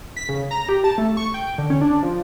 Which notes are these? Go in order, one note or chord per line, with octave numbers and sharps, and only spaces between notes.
B6
C#3
A#5
G4
A5
A3
C#6
G5
D3
C#4
D4
F3